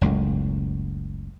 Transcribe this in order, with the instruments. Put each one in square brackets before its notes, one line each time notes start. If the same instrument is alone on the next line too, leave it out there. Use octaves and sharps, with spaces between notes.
[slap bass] F#1 C#2 A2